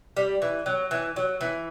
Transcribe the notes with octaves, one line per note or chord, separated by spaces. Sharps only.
G3
E3
F#3
E3
F#3
E3